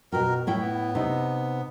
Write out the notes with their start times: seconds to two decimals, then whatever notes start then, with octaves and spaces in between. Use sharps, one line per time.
0.12 B2 F#4 A#4 G5
0.47 A2 E4 C#5 G5
0.61 B3
0.95 C3 D#4